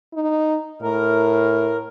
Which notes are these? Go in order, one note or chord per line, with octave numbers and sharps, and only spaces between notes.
D#4
A2 A#4